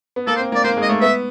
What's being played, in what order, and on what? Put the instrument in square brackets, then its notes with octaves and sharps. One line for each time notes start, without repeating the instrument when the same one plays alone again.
[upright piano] B3
[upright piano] A#3 [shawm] A4
[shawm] C5
[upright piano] C4
[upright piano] A#3 [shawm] D5
[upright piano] A#3 [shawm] C5
[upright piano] G#3
[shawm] D#5
[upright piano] A3
[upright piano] B3 [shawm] E5